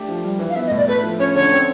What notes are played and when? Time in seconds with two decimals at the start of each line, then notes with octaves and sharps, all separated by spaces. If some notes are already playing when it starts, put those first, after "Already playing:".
Already playing: A3 D4 G4
0.09 F3
0.25 G3
0.39 E3
0.50 F5
0.55 B3 E5
0.66 D#5
0.71 A2
0.77 D5
0.87 A3 B4
1.04 F3
1.19 C#4 C#5
1.35 D3 C#5
1.51 C4